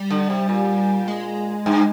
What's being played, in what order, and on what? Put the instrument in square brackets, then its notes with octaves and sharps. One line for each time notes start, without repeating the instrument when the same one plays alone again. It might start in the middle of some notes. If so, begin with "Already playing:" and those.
Already playing: [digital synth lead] G3
[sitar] D3
C3
A#2
[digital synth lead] G#3
[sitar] G2